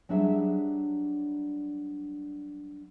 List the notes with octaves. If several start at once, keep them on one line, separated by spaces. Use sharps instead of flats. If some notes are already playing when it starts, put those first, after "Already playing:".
F#3 G3 D4 E4 G#4 E5